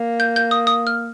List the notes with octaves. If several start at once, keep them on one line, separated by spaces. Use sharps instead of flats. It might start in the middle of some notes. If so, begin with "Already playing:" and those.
Already playing: A#3
G6
G6
D#6
D#6
F6